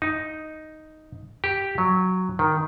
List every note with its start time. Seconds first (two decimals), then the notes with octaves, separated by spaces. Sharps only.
0.02 D#4
1.44 G4
1.78 F#3
2.39 D#3